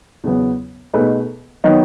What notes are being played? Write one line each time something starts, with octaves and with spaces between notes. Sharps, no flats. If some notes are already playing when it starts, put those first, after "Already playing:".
E2 C#3 F#3 B3
B2 A3 D#4 G#4 B4
D#3 F#3 B3 D#4